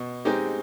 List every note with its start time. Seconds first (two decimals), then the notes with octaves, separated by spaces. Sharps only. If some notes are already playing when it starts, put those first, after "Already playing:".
Already playing: B2
0.25 G#3 C4 D#4 G4